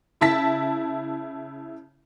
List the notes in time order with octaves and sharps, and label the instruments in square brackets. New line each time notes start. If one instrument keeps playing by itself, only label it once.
[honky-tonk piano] C#3 E4 A5 B6